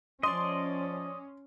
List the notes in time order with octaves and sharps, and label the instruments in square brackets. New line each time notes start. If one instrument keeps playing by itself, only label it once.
[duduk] F3 [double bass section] C#4 [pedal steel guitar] D5 D#5 [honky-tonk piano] C6